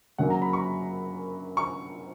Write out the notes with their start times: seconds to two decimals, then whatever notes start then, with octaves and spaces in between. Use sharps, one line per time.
0.18 F#2 C#3 F#3 A#3 F#5
0.30 A#5
0.42 B5
0.53 C#6
1.57 C#6